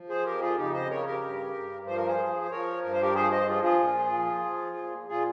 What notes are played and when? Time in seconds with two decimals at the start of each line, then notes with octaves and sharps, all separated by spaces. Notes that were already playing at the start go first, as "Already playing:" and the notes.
Already playing: F3
0.09 G#4 C5
0.25 F2 G4 A#4
0.41 F4 G#4
0.58 C#3 D#4 G4
0.73 C5 D#5
0.90 C#3 A#4 C#5
1.06 G4 A#4
1.22 G2
1.54 G2
1.86 F3 C5
1.97 A#4
2.07 G#4 C5
2.19 F3
2.42 C5
2.51 F3 A#4 C#5
2.83 G2 A#4
2.93 C5
3.02 G4 A#4
3.15 F3 G#4 C5
3.32 C5 D#5
3.48 F3 F4 G#4
3.63 F4 G#4
3.79 A#2
4.12 F3
4.44 F3
4.77 A#2
5.09 A#2 F4 G#4